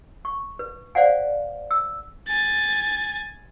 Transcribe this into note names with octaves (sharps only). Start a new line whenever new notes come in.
C#6
B4
C5 D5 F5 F#5 G#5
E6
G#5 A6